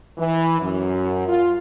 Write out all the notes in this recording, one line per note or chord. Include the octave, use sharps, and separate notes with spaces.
E3
F#2
F4